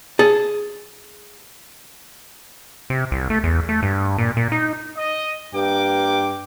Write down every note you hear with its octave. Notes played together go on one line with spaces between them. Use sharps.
G#4 A5
C3
C2
A3
E2
A3
G2
A#2
A#2
D#4
D#5
G2 A#3 G5 D6